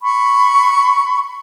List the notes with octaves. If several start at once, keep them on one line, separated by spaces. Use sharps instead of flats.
B5 C#6